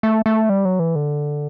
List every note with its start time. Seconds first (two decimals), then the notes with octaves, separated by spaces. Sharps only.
0.03 A3
0.26 A3
0.49 G3
0.65 F#3
0.79 E3
0.95 D3